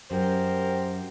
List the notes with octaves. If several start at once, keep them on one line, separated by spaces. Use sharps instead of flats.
F#2 G4 A#4 C5